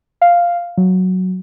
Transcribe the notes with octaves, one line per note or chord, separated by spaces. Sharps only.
F5
F#3